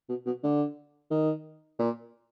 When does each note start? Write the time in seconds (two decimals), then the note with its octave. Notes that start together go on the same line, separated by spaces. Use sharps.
0.09 B2
0.26 B2
0.43 D3
1.11 D#3
1.79 A#2